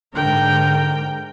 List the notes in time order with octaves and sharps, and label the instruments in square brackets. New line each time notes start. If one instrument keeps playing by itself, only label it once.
[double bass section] G#2 D3 [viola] A#4 G5